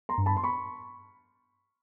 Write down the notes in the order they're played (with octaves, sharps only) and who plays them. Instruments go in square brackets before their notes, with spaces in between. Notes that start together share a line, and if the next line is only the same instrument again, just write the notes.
[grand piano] A#5 C6
[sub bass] G2
[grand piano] A5 B5
C6
B5 C#6